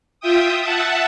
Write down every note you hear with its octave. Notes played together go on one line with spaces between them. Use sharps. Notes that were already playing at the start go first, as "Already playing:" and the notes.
F4 E5 G5 D#6
E5 F#5 A5